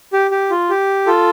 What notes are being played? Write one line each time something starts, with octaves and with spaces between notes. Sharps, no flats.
G4
G4
F4
G4
F4 A4